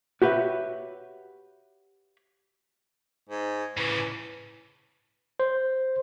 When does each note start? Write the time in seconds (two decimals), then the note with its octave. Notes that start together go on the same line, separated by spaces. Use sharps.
0.22 F#4 G4 B4 C#5 E5
3.29 G#2
3.77 A2 C#3 E3
5.40 C5